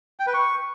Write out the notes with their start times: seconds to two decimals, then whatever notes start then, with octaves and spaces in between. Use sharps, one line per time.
0.20 G5
0.27 B4
0.34 C#6